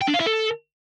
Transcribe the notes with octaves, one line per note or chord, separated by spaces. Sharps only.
G5
D4
F5
E4
A4